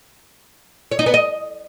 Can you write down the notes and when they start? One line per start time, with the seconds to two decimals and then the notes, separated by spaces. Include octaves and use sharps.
0.92 C#5
0.99 D#4
1.06 B3
1.14 D#5